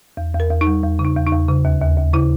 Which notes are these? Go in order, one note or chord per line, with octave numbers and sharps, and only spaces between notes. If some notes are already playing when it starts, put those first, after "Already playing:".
E2
E2
A#4
E2
D#4
G3
E2
C#3
D#4
E2
D#4
E2
C#3
D#2
D#2
D#2
C#3 E4